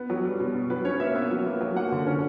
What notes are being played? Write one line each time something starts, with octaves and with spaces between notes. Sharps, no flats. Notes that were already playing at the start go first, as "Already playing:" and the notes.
Already playing: B3
F#3
G3
B2
B3
F#3 B4
C#4 C#5
A#3 E5
B3
F#3
A#3
F#3
A#3 F#5
D3
C#4